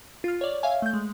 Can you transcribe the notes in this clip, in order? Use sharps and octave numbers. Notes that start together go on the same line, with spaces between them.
F4 F6
C#5 D5
C#5 E5 F5 G#5
A3 G6
G#3